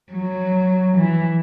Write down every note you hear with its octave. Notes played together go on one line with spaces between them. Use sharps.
F#3
E3